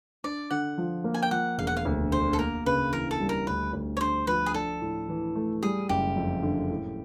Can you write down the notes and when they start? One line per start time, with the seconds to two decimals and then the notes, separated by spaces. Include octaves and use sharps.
0.24 D4 D5
0.50 D3 F#5
0.78 F3
1.04 A#3
1.14 G#5
1.23 G5
1.31 F3 F#5
1.58 E1 F5
1.67 F#5
1.77 F5
1.85 D2
2.12 D3 C5
2.33 A4
2.39 A#3 A#4
2.66 C#3 B4
2.93 E3 A#4
3.11 A4
3.20 G3
3.29 A#4
3.47 D2 B4
3.73 D2
3.97 C#5
4.01 D3 C5
4.27 F3 B4
4.46 G#4
4.54 D4 A4
4.81 A2
5.09 E3
5.36 A3
5.63 G3 G#4
5.89 F#1 G4
6.16 F2
6.43 D3
6.70 A2